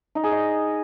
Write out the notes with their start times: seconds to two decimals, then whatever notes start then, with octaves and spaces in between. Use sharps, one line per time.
0.15 D#4
0.24 G#4
0.32 D#5